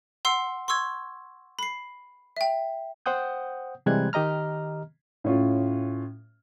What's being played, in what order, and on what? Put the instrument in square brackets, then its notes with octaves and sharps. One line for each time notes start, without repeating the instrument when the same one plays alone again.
[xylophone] F#5 C6 E6 C7
C6 C#6 E6 G#6
B5 C7
E5 G5
[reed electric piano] C5 F#5 G5 D#6 G6
C3 E3 G3 G#3 F#6 G#6
D#3 G4 D#5 A#5 F6
[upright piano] A2 C#4 F4